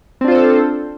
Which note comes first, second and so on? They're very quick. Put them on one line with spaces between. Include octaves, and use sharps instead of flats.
C4 D4 F4 C5 A4